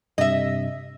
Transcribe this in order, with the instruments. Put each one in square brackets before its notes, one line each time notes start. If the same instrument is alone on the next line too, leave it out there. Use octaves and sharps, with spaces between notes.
[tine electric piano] G2 C3 [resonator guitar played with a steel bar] D#5 E5